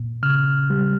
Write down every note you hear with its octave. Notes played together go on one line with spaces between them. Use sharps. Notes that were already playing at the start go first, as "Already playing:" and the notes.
Already playing: A#2
C#3 F6
G3